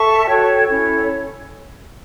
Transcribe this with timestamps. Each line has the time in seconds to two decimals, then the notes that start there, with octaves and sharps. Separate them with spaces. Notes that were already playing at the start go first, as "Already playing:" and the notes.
Already playing: A4 E5 A5 C#6
0.27 F#4 A4 C#5 G5
0.68 C#4 E4 A4 C#5